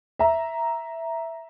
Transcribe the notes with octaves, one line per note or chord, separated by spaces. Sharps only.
E5 A#5